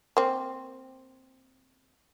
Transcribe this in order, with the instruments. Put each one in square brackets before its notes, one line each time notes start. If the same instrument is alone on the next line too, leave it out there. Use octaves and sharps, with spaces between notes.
[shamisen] A#3 C4